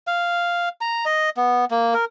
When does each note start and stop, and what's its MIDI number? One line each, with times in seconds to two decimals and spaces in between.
0.07 0.69 77
0.81 1.05 82
1.05 1.30 75
1.37 1.65 59
1.71 1.94 58
1.94 2.05 70